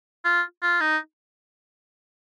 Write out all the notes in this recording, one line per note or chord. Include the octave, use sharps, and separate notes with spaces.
F4
F4
D#4